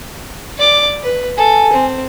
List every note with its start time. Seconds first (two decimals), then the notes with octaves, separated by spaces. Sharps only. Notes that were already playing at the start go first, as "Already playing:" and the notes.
0.58 D5 D6
1.03 B4
1.37 A4 G#5
1.73 C4